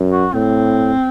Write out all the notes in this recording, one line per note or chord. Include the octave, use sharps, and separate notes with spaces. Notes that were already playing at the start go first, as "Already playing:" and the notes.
Already playing: F#2
F#4
A2 C4